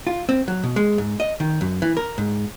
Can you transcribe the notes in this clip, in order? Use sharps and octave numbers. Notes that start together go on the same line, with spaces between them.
F4
C4
F#3
B2
G#3
G#2
D#5
D#3
F#2
E3
A#4
G#2